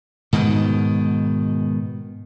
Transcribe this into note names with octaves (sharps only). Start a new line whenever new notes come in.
G#2 B2 D#3